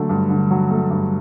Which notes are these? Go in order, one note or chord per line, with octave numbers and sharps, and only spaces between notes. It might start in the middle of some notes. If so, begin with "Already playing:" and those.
Already playing: D3 F#3 A3
G2
D3
F#3
A3
G2